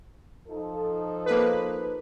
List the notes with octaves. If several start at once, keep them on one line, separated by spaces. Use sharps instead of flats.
F3 D#4 A4
A#3 B4